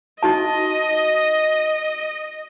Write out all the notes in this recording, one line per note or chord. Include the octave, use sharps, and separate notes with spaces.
D#4 F#4 D#5 A5